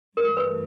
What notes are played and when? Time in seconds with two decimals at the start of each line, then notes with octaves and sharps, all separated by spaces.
0.17 G2 E3 A3 A#4
0.37 B4